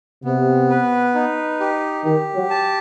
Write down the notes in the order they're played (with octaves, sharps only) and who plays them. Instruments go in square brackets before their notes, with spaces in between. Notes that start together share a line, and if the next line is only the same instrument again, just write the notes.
[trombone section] C3 [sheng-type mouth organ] B3
[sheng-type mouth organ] B4
D#4
G4
[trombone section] D#3 [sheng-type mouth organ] G4
[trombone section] F#3
[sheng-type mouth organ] A5